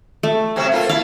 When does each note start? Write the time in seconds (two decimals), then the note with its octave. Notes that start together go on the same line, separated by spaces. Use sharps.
0.23 A3
0.56 C3 F#3 C4
0.72 A#3 F4 A4
0.89 E4 F5